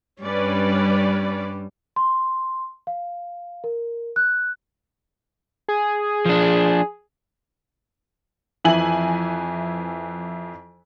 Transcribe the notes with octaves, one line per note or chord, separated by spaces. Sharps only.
G2 G3 C#4 B4 D5
C6
F5
A#4
F#6
G#4
F3 D4
F2 E3 E4 G#5 F#7